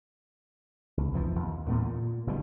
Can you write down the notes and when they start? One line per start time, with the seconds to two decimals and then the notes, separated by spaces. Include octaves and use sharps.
0.97 C#2
1.13 B1 F2 E3 F3
1.39 D#2
1.68 E2 A2 A3 B3
1.84 A#2
2.27 F#1 B2 D#3 G3